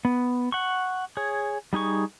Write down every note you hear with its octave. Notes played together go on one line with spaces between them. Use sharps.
B3
F#5 C#6
G#4 C#5
G3 D#4 G#4 C#6